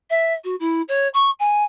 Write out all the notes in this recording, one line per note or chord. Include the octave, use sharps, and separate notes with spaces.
E5
F#4
E4
C#5
C#6
G#5